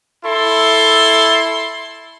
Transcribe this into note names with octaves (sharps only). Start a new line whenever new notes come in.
E4 A4 C6